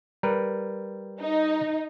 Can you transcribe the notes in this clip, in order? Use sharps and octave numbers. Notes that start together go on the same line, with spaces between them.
G3 A#4 B4
D#4